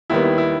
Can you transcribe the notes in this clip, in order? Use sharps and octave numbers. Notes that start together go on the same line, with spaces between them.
D#2 D#3 G3 B3 E4
E4
E4